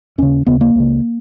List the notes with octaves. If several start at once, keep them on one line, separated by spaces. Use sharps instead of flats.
D#2 C#3 C#4
D#2 C#3 B3
A#3
C#2 C#3